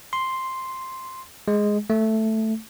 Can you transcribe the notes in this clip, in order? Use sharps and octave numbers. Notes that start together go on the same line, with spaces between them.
C6
G#3
A3